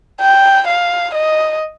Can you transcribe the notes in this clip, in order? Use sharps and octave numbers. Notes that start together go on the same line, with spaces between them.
G5
F5
D#5